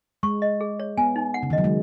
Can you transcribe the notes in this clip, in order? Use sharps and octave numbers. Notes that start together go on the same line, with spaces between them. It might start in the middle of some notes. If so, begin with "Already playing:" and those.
G#3 C#6
D#5
G#4
C#5
B3 G#5
D#4
F#5
C#3
D#3
F#3 D#5
G#3